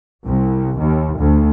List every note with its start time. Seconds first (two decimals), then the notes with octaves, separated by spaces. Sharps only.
0.24 C2
0.76 D#2
1.18 D2